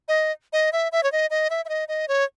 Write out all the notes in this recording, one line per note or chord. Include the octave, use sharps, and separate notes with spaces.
D#5
D#5
E5
E5
C#5
D#5
D#5
E5
E5
D#5
D#5
C#5